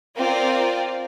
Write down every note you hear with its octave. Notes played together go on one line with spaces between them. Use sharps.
C4 F4 A#4 D5